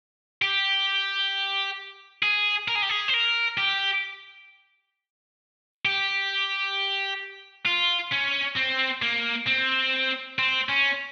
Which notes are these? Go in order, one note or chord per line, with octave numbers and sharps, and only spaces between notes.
G4
G#4
A#4
G#4
G4
G#4
C5
A#4
G4
G4
F4
C#4
C4
A#3
C4
C4
C#4